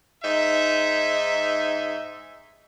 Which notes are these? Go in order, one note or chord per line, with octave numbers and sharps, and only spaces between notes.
G#2 D#4 E5